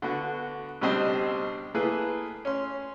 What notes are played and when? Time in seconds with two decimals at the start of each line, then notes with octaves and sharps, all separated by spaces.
0.02 D3 B3 F#4
0.81 C#2 B2 G3 C4 D4 D#5
1.75 A3 A#3 E4 G#4 B4
2.45 C#4 C6